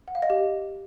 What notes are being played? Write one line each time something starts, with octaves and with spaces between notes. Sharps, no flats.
F#5
F5
D#5
G4